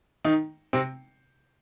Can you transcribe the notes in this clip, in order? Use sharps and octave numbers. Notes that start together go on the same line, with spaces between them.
D#3 D#4
C3 C4